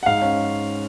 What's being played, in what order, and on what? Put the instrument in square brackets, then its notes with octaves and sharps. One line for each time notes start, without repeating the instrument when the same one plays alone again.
[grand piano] F#5
G#2 F5
C#4